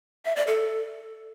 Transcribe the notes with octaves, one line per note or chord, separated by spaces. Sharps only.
E5
D5
A4